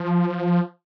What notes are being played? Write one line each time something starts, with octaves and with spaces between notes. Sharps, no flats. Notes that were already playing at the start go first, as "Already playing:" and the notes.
Already playing: F3